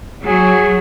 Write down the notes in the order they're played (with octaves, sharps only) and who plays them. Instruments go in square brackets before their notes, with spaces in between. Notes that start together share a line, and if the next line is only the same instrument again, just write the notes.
[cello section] F#3 [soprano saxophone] G#4